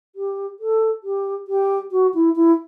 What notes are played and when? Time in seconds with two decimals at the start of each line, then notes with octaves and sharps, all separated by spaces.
0.15 G4
0.60 A4
1.03 G4
1.48 G4
1.92 F#4
2.14 E4
2.36 E4